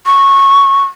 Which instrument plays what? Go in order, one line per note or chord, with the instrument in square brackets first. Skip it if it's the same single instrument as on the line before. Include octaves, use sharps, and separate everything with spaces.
[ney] C#6